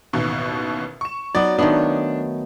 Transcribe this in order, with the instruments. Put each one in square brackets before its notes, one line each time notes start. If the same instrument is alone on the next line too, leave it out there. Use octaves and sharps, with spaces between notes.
[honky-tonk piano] A1 D#2 B2
C#6 E7
[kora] F#3 B3 [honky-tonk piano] D#4 [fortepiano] D5
[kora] D#3 A3 B3 [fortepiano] D4